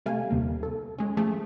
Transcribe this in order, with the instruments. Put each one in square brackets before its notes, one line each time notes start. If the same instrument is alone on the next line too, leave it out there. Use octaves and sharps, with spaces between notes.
[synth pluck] C3 G3 A3 F5 G#5
D#2 C3 D#3 A#3
A4
G#3 C#4
F3 A3 G#4